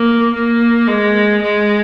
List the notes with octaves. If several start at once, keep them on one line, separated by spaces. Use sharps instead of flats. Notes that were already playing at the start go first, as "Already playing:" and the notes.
Already playing: A#3
A#3
G#3
G#3